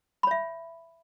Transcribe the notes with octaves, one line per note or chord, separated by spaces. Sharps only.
C#5 E5 B5